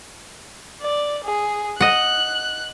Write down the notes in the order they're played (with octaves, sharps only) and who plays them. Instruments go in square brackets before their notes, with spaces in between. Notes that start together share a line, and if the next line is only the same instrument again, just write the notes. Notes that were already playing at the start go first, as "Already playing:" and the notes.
[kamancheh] D5
G#4
[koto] D#5 F#5 [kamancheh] F#6